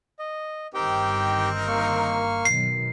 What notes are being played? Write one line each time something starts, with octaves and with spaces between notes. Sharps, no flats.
D#5
G1 G2 D#3 C4 D#4 G4 A#4 G5
A#3 C#6 F6
B2 D#3 F#3 C7